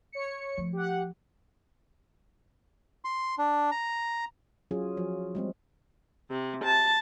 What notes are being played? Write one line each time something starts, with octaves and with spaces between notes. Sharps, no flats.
C#5 C#7
F3 A3
G4 F#5
C6
D4
A#5
F#3 C#4 F4 G#4
F3 F#3
G3 G#3 C4
C3
A5